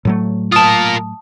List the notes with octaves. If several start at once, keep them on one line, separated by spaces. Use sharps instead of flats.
A2 F#3 A3
F4 A#4 A5 D#6